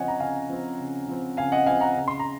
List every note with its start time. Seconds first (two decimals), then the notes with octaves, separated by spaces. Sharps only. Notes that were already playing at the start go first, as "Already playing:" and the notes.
Already playing: C#3 F3 C4 C#5 D#5 F#5 G#5
0.08 A#5
0.20 C#3 F5 G#5
0.49 F3 C4
0.79 C#3
1.08 F3 C4
1.37 C#3 F5 G#5
1.52 D#5 F#5
1.66 F3 C4 F5 G#5
1.81 F#5 A#5
1.96 C#3
2.08 C6
2.20 A#5